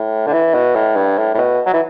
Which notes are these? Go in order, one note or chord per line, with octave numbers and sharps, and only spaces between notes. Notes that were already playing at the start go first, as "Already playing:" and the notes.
Already playing: A2
D3
E3
B2
A2
G2
A2
A2
B2
F#3
E3